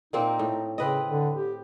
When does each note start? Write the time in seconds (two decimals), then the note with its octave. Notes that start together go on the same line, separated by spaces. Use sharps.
0.13 A#2 A#3 C4 D#4
0.39 A2
0.78 C#3 C4 B4 D#5
1.06 D3
1.35 G4